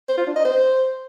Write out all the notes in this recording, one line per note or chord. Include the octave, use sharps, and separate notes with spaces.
C5
F4
D4
D#5
C5